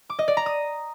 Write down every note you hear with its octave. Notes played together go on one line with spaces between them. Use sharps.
D6
D#5
D5
A#5
D#6